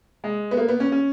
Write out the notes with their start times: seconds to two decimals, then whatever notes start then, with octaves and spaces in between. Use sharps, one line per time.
0.24 G#3
0.51 B3
0.57 A#3
0.69 B3
0.80 C#4
0.92 C#4